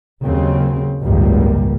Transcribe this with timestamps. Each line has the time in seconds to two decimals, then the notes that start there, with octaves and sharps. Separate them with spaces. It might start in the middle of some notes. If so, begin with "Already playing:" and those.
0.21 D#2 C#3 F#3 C4
1.03 G#1 C#2 F#2 G3 A#3